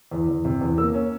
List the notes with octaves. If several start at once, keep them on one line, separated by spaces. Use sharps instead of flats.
E2
E2
C3
E2
A#3 E6
C#4